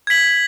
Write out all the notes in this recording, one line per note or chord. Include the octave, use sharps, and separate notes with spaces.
G#6 B6 F#7